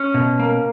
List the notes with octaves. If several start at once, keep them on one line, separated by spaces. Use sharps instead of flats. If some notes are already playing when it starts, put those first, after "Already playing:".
Already playing: C#4
B2
A#3